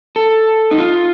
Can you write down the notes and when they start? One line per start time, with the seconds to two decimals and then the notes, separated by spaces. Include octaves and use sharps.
0.16 A4
0.71 D#4
0.78 F4